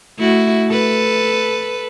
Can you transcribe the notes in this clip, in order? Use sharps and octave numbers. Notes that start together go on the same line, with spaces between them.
A3 E4 F#4
A4 B4